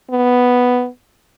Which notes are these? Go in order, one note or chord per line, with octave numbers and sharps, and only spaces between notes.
B3